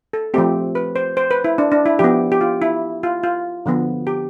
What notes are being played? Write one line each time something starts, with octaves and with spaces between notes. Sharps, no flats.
A4
F3 A3 C4 G4
B4
C5
C5
B4
E4
D4
D4
E4
F3 B3 G4
G4
F4
E4
F4
F4
D3 F3 B3
G4